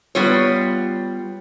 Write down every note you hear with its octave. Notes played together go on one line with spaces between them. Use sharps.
G3 B3 F4 C#5